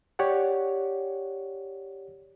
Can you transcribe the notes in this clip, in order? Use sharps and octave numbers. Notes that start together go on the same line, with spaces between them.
G4 C#5 D5 F#5